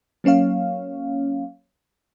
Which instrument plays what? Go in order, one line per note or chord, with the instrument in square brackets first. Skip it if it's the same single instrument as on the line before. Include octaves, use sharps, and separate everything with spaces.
[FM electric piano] F#3 A#3 C#4 C#5 F5